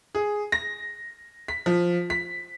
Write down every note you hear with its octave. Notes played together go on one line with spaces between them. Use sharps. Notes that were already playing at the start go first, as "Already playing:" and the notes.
G#4
A#6
B6
F3
B6